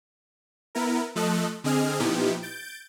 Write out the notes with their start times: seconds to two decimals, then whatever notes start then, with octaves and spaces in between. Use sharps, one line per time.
0.75 B3 E4 A#4
1.15 F3 A3 A4 D#5 F#6
1.64 D3 C4 G#4 D#5 G#5 F6
2.00 A#2 F3 B3 D#4 E4 G4
2.42 G6 A6 D7